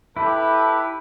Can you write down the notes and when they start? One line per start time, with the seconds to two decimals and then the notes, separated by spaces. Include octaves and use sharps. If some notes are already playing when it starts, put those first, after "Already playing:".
0.17 E4 G4 A4 B4